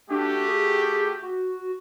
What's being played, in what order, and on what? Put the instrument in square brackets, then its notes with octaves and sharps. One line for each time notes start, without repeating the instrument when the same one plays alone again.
[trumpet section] A3 F#4 G4 [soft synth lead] D4
[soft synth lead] G#4
F#4